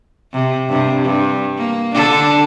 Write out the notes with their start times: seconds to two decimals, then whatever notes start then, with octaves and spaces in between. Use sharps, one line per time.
0.33 C3
0.69 G2 C3
1.04 G2
1.57 A#3
1.95 D3 D4 A4